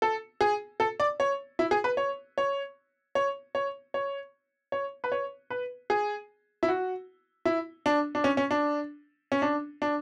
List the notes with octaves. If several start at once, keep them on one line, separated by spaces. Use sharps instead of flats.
A4
G#4
A4
D5
C#5
E4
G#4
B4
C#5
C#5
C#5
C#5
C#5
C#5
B4
C#5
B4
G#4
E4
F#4
E4
D4
D4
C#4
C#4
D4
C#4
D4
D4